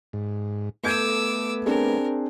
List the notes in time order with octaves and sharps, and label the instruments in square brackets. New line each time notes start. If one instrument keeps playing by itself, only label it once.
[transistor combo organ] G#2
[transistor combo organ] A3 B3 [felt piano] A4 G6 G#6 [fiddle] D6 E6
[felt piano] C4 D4 G#4 [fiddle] A#4